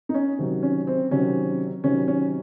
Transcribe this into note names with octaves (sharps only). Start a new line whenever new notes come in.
D#4
C#4
C3 D#3 F#3
C#4
C4
C3 D#3 F#3 C#4
C3 D#3 F#3 C#4
C#4